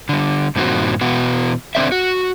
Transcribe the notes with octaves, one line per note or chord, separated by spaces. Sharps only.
D3 G3
G2 A#2 D#3 C4 F#4
B2 E3 B3 F#4
D3 C4 C5 D5 E5
F#4